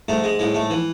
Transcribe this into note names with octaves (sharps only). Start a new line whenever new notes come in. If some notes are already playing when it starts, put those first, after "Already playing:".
G#2 A3
G#3
A2 G#3
A3
E3